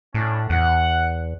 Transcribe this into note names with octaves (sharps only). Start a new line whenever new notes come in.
A2 C#4 D4
E2 F#5